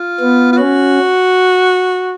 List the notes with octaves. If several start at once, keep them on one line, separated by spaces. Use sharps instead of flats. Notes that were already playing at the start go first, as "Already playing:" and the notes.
Already playing: F4
B3
F4
C#4 F#4